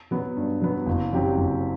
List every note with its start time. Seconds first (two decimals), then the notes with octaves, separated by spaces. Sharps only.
0.11 F#3 B3
0.37 G2
0.61 F#3 B3
0.86 F#1
1.12 F#2 F#3 C4 G4
1.38 F#1